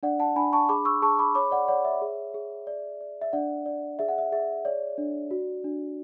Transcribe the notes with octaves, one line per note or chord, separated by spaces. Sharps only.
D4 D5 F#5
F#5 A5
D4 G#5 B5
A5 C#6
G#4 B5 D6
C#6 E6
G#4 A5 C#6
B5 D6
C#5 B5 D6
D5 F#5
C#5 D5 F#5
E5
G#4
G#4
D5
D5
E5
D4 D5 F#5
D5
G#4 E5
F#5
E5
G#4 E5
C#5 D5
D4
F#4
D4